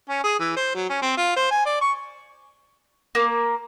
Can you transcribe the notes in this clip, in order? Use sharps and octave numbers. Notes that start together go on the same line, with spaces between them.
C#4
G#4
E3
C5
F#3
C#4
C4
F4
C5
G#5
D5
C#6
A#3